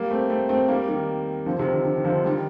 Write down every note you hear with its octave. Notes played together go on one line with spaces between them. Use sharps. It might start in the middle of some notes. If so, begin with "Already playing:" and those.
Already playing: G3 A#3
A3 C4
A3 C4
A3 C4
G3 A#3
D#3 G3
D3 F3
C3 D#3
D3
D3
D#3
D3 F3
D#3 G3